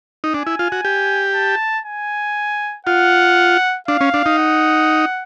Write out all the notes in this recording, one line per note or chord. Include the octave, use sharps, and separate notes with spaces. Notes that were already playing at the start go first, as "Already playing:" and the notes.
D#4
D4 G#5
E4
F4
F#4
G4
A5
G#5
F4 F#5
D4 F5
C#4
D4
D#4
F#5